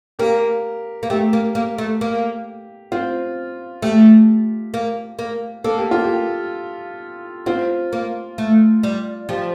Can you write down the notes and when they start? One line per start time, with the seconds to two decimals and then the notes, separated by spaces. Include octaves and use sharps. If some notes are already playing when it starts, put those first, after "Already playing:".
0.19 A#3 G4 A#4
1.03 A#3
1.10 A3 G4
1.33 A#3
1.55 A#3
1.78 A3
2.01 A#3
2.92 C4 F4
3.82 A3 G4
4.74 A#3
5.19 A#3
5.64 A#3 A4
5.78 G4
5.91 F4
6.04 G4
7.46 C4 F4
7.93 A#3
8.38 A3
8.83 G3
9.29 F3 G4